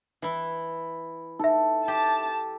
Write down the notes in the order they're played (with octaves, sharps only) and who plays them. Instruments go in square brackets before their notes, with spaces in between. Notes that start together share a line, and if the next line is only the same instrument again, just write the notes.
[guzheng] E3 E4
[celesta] D#4 E5 [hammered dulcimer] A4
[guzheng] G4 [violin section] A5